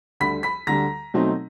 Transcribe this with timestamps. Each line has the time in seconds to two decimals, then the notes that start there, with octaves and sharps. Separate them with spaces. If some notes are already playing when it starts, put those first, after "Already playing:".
0.20 D2 D3 G3 B5 B6
0.43 B5 B6
0.67 D2 D3 G3 A#5 A#6
1.14 B2 F#3 A3 C4 D#4